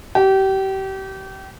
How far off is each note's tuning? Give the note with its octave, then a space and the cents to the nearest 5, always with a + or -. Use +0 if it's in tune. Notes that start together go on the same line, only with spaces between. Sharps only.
G4 -30